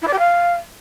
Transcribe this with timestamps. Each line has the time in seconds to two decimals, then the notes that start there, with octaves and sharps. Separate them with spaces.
0.02 E4
0.07 D5
0.13 G4
0.19 F5